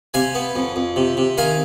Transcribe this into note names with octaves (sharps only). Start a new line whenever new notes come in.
C3 F5 G#5
B3
F2
F2
C3
C3
D#3 F5 G#5